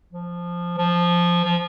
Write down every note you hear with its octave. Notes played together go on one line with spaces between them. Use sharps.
F3
F3
F3